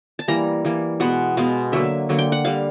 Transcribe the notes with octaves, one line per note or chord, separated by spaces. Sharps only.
A5
E3 G3 A#3 A#5
E3 G3 A#3
B2 G#3 B3 F#5
B2 G#3 B3 F5
D3 F#3 A#3 E5
D3 F#3 A#3
G5
F#5
D3 G3 A#3 F5